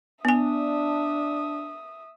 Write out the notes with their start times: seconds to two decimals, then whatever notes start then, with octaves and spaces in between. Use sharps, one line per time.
0.25 B3 D4 E5 G#5 D#6